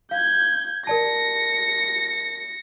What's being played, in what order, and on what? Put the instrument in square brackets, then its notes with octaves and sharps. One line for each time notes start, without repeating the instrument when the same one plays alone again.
[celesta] F5 [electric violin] G6 G#6
[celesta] A#4 D5 A5 [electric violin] A#6 C#7